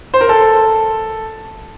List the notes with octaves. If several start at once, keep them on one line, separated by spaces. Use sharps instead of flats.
C5
A#4
A4